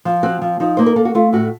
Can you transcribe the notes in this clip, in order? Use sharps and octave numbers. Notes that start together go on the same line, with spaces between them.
F3
C4 F#4
F3
F3 D#4
A#3 C5
A#4
A#3 A4
F#4
A3 F4
A2 F#4